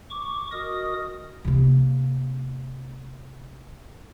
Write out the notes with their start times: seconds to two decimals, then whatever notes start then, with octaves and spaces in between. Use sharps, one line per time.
0.10 C#6 D6
0.52 F#4 A#4 D#5 D#6
1.45 C3 A#3